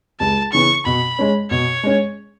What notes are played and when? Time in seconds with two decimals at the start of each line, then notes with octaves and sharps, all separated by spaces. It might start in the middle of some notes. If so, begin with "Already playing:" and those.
0.20 C#2 A5
0.52 C#3 E3 B3 C#6
0.85 B2 B5
1.19 G#3 C#4
1.50 B2 C#5
1.83 G#3 C#4